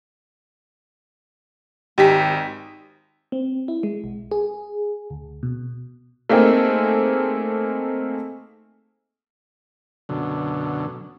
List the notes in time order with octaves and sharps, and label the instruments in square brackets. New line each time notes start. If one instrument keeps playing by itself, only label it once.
[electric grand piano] G#1 D#4 B6 [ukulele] G4 G#5
[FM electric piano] C4
E4
G#3
B1
G#4
D2
B2
[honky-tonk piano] A3 A#3 C4 D#4 G#4
[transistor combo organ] F#2 B2 D3